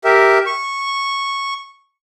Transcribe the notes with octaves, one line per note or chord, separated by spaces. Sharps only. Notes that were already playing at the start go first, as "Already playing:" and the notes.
G4 A#4 E5
C#6